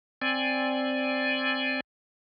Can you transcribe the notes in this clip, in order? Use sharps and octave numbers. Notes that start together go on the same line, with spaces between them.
C4 D5 G#5